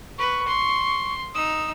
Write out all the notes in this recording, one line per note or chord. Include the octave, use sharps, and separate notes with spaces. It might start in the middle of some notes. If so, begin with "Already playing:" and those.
B4 C#6
C6
D#4 D#6 E6